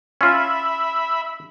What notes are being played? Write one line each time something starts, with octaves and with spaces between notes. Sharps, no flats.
C#4 F4 E5 B5